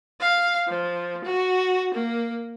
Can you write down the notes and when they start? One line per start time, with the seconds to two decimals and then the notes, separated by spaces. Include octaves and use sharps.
0.20 F5
0.68 F3
1.24 F#4
1.94 A#3